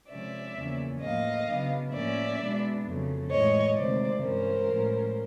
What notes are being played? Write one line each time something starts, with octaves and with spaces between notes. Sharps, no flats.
C3 F3 G#3 C#4 D5 E5
E2 C#3 F3 A#3 C#4
A2 F3 A#3 D#5 F5
C#3 F#3 B3 D4
A2 F3 A#3 C#4 D5 E5
B2 G#3 B3 D4
F2 C#3 F#3 A3
A2 E3 G#3 C#5 D#5
D2 C3 D#3 G#3 C5 D5
G2 E3 G#3 C#4 A#4 C5
A2 F3 G#3 C#4